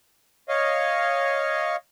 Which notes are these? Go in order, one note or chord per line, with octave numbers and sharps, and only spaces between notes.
C#5 D#5 F5